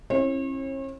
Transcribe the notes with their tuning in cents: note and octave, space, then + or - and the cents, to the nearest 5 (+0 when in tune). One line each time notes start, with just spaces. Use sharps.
C#4 -45 E4 +0 C#5 -40